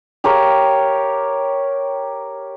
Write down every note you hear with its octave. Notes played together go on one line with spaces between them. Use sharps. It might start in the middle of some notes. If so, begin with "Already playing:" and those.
G4 A#4 C#5 F5